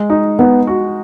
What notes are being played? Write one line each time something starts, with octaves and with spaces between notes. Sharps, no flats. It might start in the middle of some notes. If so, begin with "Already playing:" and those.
Already playing: G#3
D#4
B3 D#4
F#4